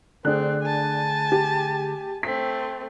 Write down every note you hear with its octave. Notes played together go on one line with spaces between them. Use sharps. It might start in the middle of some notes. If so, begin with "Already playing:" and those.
D3 A3 C4 D4 G#4 D5 F#6
G#5 A5
G4
A3 C4 B6